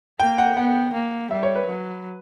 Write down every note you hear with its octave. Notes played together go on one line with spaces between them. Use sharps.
A#3 G5
F#5
B3 F#5
A#3
G3 E5
C#5
B4
F#3